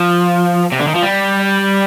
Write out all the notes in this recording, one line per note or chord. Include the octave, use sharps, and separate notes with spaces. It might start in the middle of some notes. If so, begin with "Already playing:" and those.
Already playing: F3
C3
D3
D#3
F3
G3